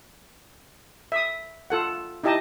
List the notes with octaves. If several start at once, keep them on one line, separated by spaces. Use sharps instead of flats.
E5 D#6
F4 A4 F#5
D#4 E4 G4 D#5 A5